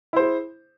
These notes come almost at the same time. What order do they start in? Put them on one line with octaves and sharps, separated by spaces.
E4 C5 G#4